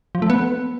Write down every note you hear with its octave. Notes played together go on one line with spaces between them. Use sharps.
F3
A3
B3